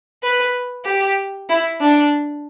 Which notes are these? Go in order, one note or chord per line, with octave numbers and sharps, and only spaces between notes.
B4
G4
E4
D4